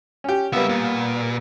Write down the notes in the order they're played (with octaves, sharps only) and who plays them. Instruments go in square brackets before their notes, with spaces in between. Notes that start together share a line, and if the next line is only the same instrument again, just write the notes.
[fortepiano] C#4 G4
[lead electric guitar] C#2 E5 [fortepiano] G3 A#3 B3
[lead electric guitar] A#2